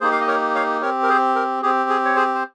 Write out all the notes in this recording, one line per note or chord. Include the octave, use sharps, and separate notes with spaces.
A#3 D#4 G4 G#4 C5
F5
D#5
A#4 C#5
C#5 F5
C4 G4 A#4 C#5
A#4
G#4 C5
A#4
C4 G4 G#4
G#4
C#5
G#4 C5
C5